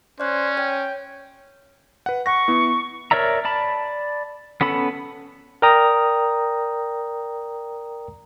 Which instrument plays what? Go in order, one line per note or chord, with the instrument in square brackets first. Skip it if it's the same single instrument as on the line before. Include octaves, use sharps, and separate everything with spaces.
[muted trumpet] C#4 [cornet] C5 [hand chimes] D5 F#6
[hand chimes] C#5 [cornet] G5
[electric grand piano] B4 F#5
[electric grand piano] F#5 A#6 [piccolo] C#6
[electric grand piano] B3 E4
[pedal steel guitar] A#4 C#5 D5 E5 A#5
D5 A5 B5
B3 C#4 A4 B5
[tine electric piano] A#4 D5 G5 A#5 D#6